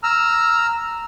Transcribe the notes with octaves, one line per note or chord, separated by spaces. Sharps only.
A#5 E6 F6